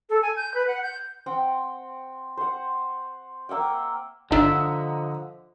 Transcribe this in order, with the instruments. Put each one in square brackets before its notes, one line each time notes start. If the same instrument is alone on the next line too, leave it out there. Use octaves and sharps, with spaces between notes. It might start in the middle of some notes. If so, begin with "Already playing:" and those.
[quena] A4
G#5
G6
B4
F#5
G6
[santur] C4 F#5 G5
C5 F#5
A#3 E5 F#5 G5
[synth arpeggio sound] G1 D4 [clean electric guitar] D3 E5 [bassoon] F3 [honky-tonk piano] D#5 F#5 A#5